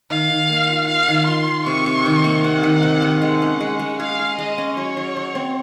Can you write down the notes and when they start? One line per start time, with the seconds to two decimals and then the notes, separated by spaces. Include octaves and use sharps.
0.10 D#3 F5
0.30 D#3
0.50 A#3
0.69 F4
0.88 F4 F5
1.08 D#3
1.27 F4 C6
1.47 D#3
1.66 C3 C#6
1.86 C3
2.06 D#3
2.24 A#3
2.44 C3 F#5
2.63 D#3
2.83 C3
3.02 D#3
3.22 G#3 F#5
3.42 C#4
3.61 G#3
3.79 G#3
3.99 G#4 F5
4.19 G#4
4.38 G#3 D#5
4.58 C#4
4.77 F#3 C#5
4.97 F#3
5.17 F#3
5.35 C4